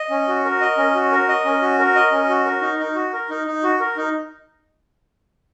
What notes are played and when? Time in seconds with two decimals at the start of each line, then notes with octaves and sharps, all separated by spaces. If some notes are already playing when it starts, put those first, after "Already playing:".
Already playing: D#5
0.10 C#4
0.28 F#4
0.45 A#4
0.61 D#5
0.78 C#4
0.95 F#4
1.12 A#4
1.29 D#5
1.45 C#4
1.62 F#4
1.79 A#4
1.96 D#5
2.12 C#4
2.29 F#4
2.45 A#4
2.62 D#4
2.79 D#4
2.96 F#4
3.13 A#4
3.30 D#4
3.47 D#4
3.63 F#4
3.80 A#4
3.97 D#4